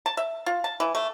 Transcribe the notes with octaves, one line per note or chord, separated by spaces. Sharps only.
A5
E5
F4
A5
E3
A3